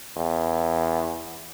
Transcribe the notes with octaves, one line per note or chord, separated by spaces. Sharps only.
E2